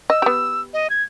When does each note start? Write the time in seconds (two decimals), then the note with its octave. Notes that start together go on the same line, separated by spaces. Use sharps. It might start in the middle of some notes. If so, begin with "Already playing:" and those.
0.10 D#5 E6
0.22 B3 G4
0.74 D#5
0.90 G#6